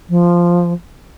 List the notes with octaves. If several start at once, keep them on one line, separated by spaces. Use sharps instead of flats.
F3